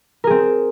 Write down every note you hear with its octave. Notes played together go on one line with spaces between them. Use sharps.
C4 G#4 A#4